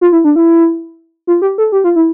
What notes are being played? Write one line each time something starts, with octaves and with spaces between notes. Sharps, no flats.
F4
E4
D4
E4
F4
G4
A4
G4
F4
E4